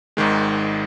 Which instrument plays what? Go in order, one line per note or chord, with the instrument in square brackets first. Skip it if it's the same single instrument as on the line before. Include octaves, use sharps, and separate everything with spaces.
[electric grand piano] G#1 G#2 D#3 G#3